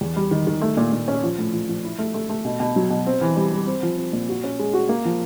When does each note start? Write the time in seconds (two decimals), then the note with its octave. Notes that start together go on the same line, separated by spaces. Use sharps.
0.01 E2
0.16 G3
0.31 D#3
0.47 D#3
0.62 A3
0.77 A#2
0.93 A#2
1.08 C#4
1.23 F3
1.39 A2
1.53 F3
1.69 F3
1.84 E4
1.99 A3
2.14 A3
2.29 A3
2.45 B2
2.60 B2
2.76 F#3
2.90 B2
3.07 C4
3.21 E3
3.36 G3
3.52 G3
3.67 C4
3.83 F3
3.97 C4
4.13 A#2
4.29 F#4
4.44 C#4
4.59 G#3
4.74 F#4
4.89 A#3
5.05 F3